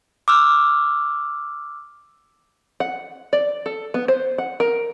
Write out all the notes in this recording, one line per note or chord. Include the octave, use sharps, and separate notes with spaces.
D6 E6 F6
F#5
D5
A4
B3
C5
F#5
A#4